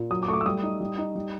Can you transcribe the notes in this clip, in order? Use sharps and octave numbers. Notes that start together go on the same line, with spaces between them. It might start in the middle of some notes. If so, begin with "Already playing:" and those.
Already playing: A#2
F#3 D#6
D6
A3 C#6
D6
E6
G3 D#6
D#4
G3
D#4
G3